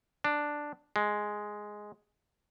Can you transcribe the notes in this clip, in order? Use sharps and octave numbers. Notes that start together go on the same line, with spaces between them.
D4
G#3